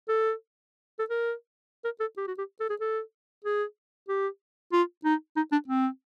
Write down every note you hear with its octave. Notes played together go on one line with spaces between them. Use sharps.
A4
A4
A#4
A#4
A4
G4
F#4
G4
A4
G#4
A4
G#4
G4
F4
D#4
D#4
D4
C4